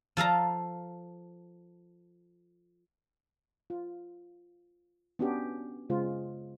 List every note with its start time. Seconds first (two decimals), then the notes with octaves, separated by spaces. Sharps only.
0.17 F3 A4 F5 A#5
3.70 F4
5.19 B3 C#4 D4 F#4 G4
5.90 C#3 G#3 F4 C5